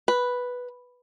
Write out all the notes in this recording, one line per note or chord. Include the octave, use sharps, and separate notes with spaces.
B4